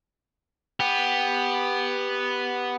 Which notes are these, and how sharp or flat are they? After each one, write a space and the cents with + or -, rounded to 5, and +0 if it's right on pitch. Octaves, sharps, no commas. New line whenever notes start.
B3 +0 G4 +10